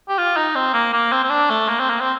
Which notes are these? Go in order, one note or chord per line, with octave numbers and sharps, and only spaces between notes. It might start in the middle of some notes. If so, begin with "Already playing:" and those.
G4
F4
D#4
C4
A#3
A#3
C4
C4
D4
A3
A#3
C4
A#3
C4